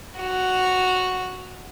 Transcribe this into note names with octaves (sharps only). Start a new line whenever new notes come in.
F#4 F7